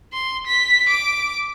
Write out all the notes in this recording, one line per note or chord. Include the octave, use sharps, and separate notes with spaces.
C6
B6
D6